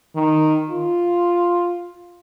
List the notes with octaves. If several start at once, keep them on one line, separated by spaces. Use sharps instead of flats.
D#3
F4